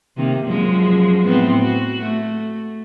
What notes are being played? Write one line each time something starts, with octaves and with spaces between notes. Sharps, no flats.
C3 D#3 A#3
F#2 F3 G#3
A2 B3 C4
F#4
A3